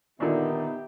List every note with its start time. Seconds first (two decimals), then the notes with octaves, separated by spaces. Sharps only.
0.20 A#2 D3 D#3 B3 D#4 G4 E5